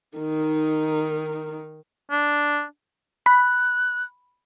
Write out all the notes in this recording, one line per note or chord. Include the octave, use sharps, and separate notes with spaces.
D#3 D#4
D4
B5 F#6